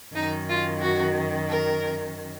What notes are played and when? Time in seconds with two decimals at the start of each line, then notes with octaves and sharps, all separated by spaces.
0.15 F#2 D#3 D#4
0.48 F4
0.81 F#4
1.49 A#4